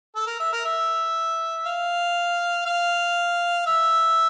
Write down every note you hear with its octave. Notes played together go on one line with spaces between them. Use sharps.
A4
A#4
E5
A#4
E5
F5
F5
E5